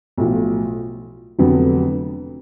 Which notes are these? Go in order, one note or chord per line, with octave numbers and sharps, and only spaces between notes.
B1 A2 F3
F1 F2 D3 F#3 B3